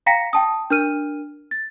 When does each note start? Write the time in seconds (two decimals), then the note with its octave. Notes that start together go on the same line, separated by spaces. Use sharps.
0.06 F5 G5 A#5 A#6 B6 C#7
0.33 G5 A5 D#6
0.70 D4 A#4 F6 D#7
1.51 A6